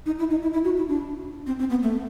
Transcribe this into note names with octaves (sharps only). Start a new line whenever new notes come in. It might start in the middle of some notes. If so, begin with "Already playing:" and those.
D#4
E4
D#4
E4
E4
F#4
E4
D4
C4
C4
B3
A3